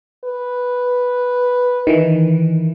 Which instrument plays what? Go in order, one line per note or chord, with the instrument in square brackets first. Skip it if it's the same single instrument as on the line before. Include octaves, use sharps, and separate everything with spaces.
[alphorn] B4
[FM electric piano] D#3 E3